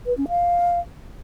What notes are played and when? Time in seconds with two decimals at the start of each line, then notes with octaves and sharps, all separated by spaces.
0.06 B4
0.17 C#4
0.29 F5